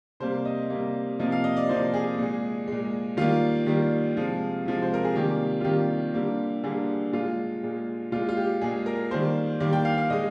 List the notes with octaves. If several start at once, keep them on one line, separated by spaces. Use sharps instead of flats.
C3 G3 A#3 C5
D#5
C3 G3 A#3
C3 F3 A#3 D#5
F5
D#5
D5
C3 F3 A#3 C5
G#4
A#2 G#3
A#2 G#3
D#3 G3 A#3 F4
D#3 G3 A#3
C3 F3 G#3
C3 F3 G#3
C5
A#4
G#4
C3 D#3 G3 A#3 G4
F4
C3 D#3 G3 A#3 G4
D3 G3 A#3
D3 G3 A#3 G#4
A#2 G#3 F4
A#2 G#3
A#2 G#3 F4
F4
G4
A#2 G#3 G#4
A#4
D#3 G3 A#3 C5
D#3 G3 A#3 D5
G5
F5
F5
A#2 G#3 D#5